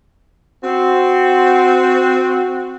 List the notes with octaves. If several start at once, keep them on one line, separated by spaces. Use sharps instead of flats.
C4 F#4